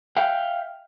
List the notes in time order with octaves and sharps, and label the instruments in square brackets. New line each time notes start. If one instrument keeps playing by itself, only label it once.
[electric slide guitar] E5 F5 G5